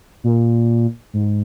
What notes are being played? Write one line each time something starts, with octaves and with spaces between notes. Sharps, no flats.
A#2
G#2